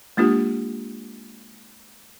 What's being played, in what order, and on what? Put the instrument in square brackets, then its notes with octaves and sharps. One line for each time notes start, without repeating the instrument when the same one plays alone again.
[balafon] G#3 A#3 D4 F4 G4